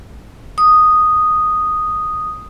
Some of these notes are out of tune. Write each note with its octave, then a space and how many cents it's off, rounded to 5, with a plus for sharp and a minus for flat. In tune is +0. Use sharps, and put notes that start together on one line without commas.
D#6 -5